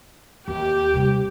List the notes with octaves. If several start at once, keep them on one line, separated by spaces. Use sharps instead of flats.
D#2 G4
C3 G3